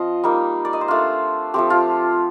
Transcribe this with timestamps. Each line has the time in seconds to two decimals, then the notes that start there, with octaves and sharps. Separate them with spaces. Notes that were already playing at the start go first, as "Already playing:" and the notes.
Already playing: F3 C4 D#5 F5
0.24 G3 A#3 D#4
0.65 D5
0.73 D#5
0.81 C5
0.88 A3 D4 F4
1.54 F3 A3 C4 G4
1.70 F4